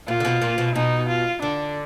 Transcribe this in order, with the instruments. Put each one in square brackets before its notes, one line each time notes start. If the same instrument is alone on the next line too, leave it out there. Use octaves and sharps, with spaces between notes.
[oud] A#2 [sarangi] F4
[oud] D3
B2
A#2
B2
[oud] B2 [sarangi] D#4
[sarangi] F4
[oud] D3 [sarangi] D4